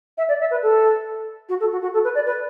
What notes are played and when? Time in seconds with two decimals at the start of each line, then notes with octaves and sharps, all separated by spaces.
0.18 E5
0.29 D5
0.40 E5
0.51 B4
0.62 A4
1.49 F#4
1.60 A4
1.72 F#4
1.82 F#4
1.94 A4
2.04 B4
2.15 D5
2.26 B4